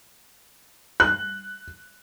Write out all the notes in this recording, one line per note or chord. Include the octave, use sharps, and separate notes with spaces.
F#6